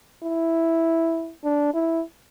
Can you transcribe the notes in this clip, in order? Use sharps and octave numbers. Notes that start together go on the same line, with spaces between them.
E4
D4
E4